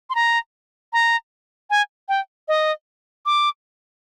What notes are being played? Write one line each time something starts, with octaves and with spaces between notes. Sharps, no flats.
C6
A#5
A#5
G#5
G5
D#5
D6